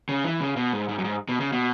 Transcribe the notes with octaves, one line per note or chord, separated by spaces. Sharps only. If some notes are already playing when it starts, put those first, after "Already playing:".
C#3
E3
C#3
B2
G#2
G#2
F#2
G#2
B2
C#3
B2